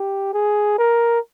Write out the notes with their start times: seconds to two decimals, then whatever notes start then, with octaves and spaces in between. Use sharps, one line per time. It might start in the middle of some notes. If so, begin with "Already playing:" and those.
Already playing: G4
0.34 G#4
0.79 A#4